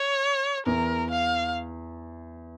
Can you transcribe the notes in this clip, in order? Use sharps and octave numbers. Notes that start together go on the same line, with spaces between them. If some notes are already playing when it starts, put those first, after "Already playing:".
Already playing: C#5
E2 A#4
F5